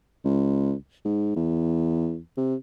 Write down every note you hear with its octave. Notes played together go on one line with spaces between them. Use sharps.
C#2
G#2
E2
C3